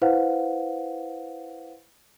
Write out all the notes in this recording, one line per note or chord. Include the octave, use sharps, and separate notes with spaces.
E4 B4 C5 F5 F#5